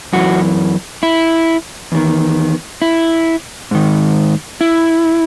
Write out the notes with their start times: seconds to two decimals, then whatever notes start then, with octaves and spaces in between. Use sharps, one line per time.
0.13 F#2 E3 F#4
1.03 E4
1.92 E2 D#3
2.82 E4
3.71 G#2 D#3
4.61 E4